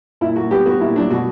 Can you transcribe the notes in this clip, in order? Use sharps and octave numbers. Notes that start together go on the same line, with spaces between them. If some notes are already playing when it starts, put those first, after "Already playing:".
A#2 E4
A#2 F#4
B3 G4
B3 F#4
A#2 E4
F#3 D4
B2 F#4